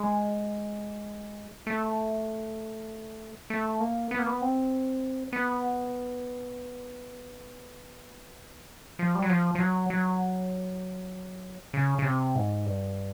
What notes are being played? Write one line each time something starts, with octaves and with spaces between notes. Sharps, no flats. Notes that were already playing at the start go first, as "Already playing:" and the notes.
Already playing: G#3
A3
A3
A#3
B3
A#3
B3
C4
B3
F3
G3
F#3
F3
F3
F#3
F#3
C#3
C#3
C3
G#2
G2